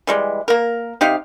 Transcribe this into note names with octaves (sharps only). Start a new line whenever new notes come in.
E3 G3 G#3
A#3 A#4
C3 D#4 G4 F5